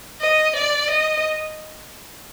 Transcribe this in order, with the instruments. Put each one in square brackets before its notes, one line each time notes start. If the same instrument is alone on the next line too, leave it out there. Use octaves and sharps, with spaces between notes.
[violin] D#5
D5
D#5